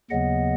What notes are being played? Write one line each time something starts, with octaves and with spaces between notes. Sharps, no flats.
D#2 C#3 F#3 B3 D#5 F#5